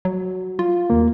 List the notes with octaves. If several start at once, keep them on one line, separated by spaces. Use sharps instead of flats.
F#3
F4
D#2 A#3